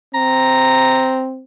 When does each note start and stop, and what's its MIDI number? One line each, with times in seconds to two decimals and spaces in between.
0.14 1.44 60
0.14 1.24 82